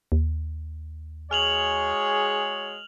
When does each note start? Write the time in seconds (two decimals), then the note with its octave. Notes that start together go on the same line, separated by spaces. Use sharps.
0.12 D#2
1.31 G#3 F#4 G#4 C#5 F6 F7 F#7